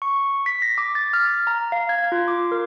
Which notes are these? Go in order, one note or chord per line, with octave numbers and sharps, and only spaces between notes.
C#6
B6
A#6
D6
A6
F6
A#5
F5
G#6
F4
D6
A#4